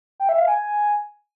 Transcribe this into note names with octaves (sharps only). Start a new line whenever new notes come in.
G5
E5
F5
G#5